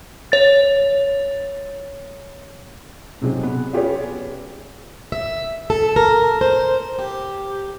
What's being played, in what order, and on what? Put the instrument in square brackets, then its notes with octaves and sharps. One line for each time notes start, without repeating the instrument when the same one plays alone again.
[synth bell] C#5 A6
[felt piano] G#2 C3 F#3 G#3 C4
B3
C#4 F4 G4 G#4 B4 C#5
[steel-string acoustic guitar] E5
A4
A#4
C5
G4